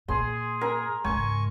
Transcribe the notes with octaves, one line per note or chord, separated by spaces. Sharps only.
A#2 G#4 C6
A#4 G#5
C#2 G#2 G#5 C#6